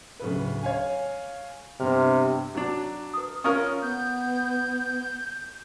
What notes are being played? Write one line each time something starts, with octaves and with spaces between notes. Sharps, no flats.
D1 C#3 B4
C#5 F5 G#5
G2 C3 B3 F6
F#3 D4
B4 D#6
C#4 F4 A#4 D#6
B3 G6